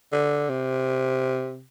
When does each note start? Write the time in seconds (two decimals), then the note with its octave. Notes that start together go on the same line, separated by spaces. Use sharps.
0.12 D3
0.49 C3